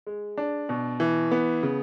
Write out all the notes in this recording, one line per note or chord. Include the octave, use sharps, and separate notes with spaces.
G#3
D4
B2
E3
B3
C#3